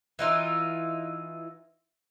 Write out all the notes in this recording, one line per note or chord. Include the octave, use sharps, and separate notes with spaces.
E3 D#4 F4